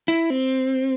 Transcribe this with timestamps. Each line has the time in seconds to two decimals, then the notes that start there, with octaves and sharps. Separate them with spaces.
0.08 E4
0.30 C4